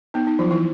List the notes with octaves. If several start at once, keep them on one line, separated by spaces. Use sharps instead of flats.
B3 D#4
D#4
F3 F#3 F4
E3 E4